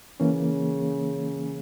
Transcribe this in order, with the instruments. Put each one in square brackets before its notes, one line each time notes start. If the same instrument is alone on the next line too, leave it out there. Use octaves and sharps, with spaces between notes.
[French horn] C#3 [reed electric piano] E3 A#3 C#4